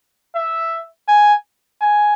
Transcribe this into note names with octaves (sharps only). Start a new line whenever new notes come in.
E5
G#5
G#5